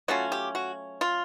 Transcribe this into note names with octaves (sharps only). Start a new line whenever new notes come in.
F#3 A3 C#4 F4 F#4
G4
F#4
F4